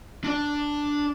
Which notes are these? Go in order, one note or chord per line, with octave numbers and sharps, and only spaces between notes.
D4 D5